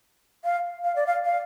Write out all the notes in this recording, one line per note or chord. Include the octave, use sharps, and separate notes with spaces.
F5
F5
D5
F5
F5